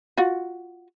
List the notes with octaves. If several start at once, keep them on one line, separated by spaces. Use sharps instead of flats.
F4 F#4